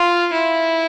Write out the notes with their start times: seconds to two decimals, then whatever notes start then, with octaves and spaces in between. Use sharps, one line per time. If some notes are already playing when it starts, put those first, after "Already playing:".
Already playing: F4
0.33 E4